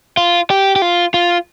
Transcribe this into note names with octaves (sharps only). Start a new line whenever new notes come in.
F4
G4
G4
F4
F4